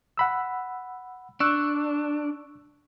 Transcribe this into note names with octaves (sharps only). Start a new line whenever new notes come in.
F#5 B5 E6
D4 C#6 E6 F#6